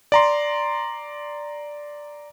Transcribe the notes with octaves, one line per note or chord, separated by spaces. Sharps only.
D5 A#5 C6